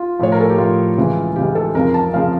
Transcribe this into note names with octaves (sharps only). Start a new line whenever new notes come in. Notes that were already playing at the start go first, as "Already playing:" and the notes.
Already playing: F4
A2 F3 C#5
A#4
A4
G4
A2 F3 F4
C#2 C#3 E3
C#2 C#3 E3 G4
A4
F2 C#3 F3 A#4
A5
C#3 F3 F5